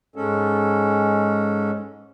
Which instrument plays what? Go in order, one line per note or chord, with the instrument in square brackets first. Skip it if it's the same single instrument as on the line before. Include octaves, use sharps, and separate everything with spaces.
[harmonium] G#2 G#3 C#4 A4